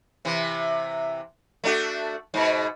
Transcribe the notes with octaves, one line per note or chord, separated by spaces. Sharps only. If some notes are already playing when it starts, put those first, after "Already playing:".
C3 E3
A3 D4 F#4
G#2 B2